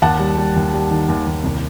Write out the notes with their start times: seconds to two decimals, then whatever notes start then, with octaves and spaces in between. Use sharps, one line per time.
0.02 D#2 F#5 A5
0.19 G3
0.37 G3
0.56 D#2
0.73 G3
0.91 D#3
1.08 D#2
1.26 D#2
1.44 C2